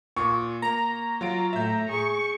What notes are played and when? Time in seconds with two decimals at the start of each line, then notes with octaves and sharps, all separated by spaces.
0.16 A#2 C#6
0.62 A#3 A#5
1.21 F#3 F4 D7
1.53 A2 E5 G6
1.89 G#4 C#6